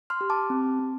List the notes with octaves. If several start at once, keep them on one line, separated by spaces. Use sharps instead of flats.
C6 F6
G4
A5 D6
C4
C4